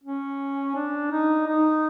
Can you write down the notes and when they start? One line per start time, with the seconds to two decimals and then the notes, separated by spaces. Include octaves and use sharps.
0.04 C#4
0.75 D4
1.11 D#4
1.47 D#4